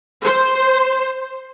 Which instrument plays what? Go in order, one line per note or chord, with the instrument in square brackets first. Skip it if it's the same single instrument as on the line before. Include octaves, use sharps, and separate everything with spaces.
[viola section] C5